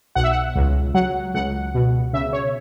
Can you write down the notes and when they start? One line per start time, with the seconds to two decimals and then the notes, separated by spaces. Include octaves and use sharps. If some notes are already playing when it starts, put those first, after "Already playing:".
0.15 B1 F#5
0.24 E5
0.31 F#5
0.56 C#2
0.94 F#3 F#5
1.34 C#2 F#5
1.74 B2
2.13 C#3 E5
2.33 C#5